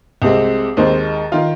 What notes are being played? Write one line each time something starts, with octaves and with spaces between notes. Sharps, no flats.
C2 C3 G#3 C4
D#2 D#3 G#3 C4 D#4 C5
D#3 F4 F5